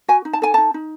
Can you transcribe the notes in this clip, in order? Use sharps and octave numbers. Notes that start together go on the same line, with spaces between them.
F#4 G#5
D#4
A5
A4 G#5
D#4 A5
D#4